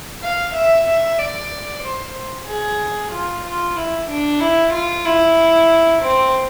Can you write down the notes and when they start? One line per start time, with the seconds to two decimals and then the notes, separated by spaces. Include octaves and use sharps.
0.23 F5
0.54 E5
0.87 E5
1.18 D5
1.83 C5
2.47 G#4
3.12 F4
3.45 F4
3.77 E4
4.09 D4
4.40 E4
4.73 F4
5.05 E4
6.02 C4